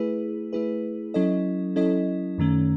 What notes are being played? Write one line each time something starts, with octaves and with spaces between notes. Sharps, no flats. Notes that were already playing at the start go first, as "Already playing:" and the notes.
Already playing: A3 E4 G#4 B4
A3 E4 G#4 B4
F#3 C#4 E4 A4 D#5
F#3 C#4 E4 A4 D#5
F#2 D#3 A3 C#4